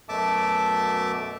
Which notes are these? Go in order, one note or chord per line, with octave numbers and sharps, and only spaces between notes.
F#2 B2 A3 E5 A5 D6